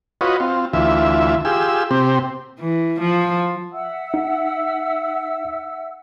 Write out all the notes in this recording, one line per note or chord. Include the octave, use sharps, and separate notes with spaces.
F4 F#4 B4 C#5 D#5
C4 F4
D2 E3 F4 E5
F4 G4 G#4 E6
C3 C4 G4
E3
F3
E5 F#5 E6
D#4